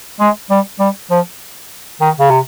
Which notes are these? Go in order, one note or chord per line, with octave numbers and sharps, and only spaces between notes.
G#3
G3
G3
F3
D#3
C#3
C3